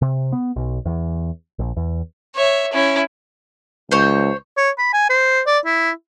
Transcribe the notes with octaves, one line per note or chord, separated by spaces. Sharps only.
C3
B3
B1
E2
A#1
E2
C#5 E5
C#4 E4
C#2 C5 C#5
C#5
B5
G#5
C5
D5
E4